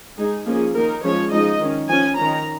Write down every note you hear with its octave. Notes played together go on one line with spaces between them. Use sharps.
G#3 D#4 G#4
F3 A#3 C#4 G#4
D#3 A#3 D#4 A#4
F3 G#3 C#4 C#5
F3 G#3 D#4 D#5
D#3 C#4
F3 C#4 G#5
D#3 C#4 A#5